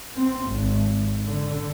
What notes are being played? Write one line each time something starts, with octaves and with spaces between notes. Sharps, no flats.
C4
G#1
D3